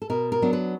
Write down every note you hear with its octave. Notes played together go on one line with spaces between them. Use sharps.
A4
B2 A#4
A#4
F#3 B3 D4
B4